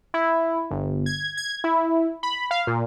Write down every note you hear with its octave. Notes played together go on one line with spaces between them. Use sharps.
E4
G1
G#6
G#6
E4
B5
F5
A#2